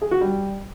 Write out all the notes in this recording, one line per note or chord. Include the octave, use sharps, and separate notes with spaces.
G#4
F#4
G3